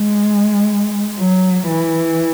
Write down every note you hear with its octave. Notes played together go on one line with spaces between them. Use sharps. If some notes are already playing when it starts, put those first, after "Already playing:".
Already playing: G#3
F#3
E3